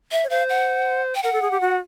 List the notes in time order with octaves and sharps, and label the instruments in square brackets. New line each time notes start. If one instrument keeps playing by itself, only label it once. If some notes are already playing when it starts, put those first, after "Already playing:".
[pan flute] E5
[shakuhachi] C#5
[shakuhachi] C5 [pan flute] F5
[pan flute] F#5
G5
[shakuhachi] A#4 [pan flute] F#5
[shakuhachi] A4
G#4
G4
F#4